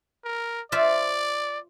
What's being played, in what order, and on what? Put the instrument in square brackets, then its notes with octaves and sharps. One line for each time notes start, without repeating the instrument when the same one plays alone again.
[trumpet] A#4
[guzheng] F4 C5 E5 [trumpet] D5